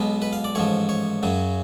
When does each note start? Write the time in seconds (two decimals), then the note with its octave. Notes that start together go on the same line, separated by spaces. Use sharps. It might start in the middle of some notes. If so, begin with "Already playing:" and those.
Already playing: B1 B2 G#3 B3
0.22 B4
0.33 F5
0.44 D5
0.55 A1 G#2 F3 C#5
0.89 C#5
1.23 F#2 C#3 F#3